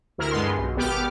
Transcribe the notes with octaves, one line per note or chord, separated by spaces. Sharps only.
D2 E4 A#4 F6
G2 G#3 B3 C6
B1
G#1 B3 G4 D6 F6